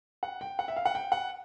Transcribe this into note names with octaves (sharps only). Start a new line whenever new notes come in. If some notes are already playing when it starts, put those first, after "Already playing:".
F#5
G5
F#5
E5
F5
F#5
G5
F#5